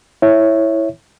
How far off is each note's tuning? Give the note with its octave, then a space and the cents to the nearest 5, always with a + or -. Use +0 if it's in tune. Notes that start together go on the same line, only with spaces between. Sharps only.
E4 +0 C#5 -10 E5 +0